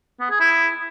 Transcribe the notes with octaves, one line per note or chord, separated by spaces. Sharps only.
B3
G#4
E4